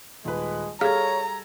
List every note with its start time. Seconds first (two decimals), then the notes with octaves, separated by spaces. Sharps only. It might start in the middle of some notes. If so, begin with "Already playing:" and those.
0.25 D#1 G#3 B4
0.81 G3 G#4 A4 C#5 F5 A#5 F6 G#6